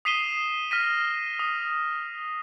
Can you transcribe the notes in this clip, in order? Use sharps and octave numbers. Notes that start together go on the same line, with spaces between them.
D#6 B6 C7 D#7 E7 G7
F6 A#6 B6 D#7
D#6